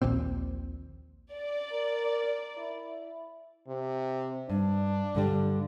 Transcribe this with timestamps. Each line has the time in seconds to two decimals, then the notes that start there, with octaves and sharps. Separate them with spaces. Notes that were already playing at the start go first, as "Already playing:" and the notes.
0.02 A#1 D#2 A#2 C4
1.34 D5
1.72 A#4
2.58 E4
3.68 C3
4.49 G2 D4
5.15 G2 D3 G3